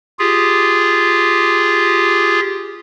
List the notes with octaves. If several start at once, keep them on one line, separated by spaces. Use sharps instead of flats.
F4 G4 G#4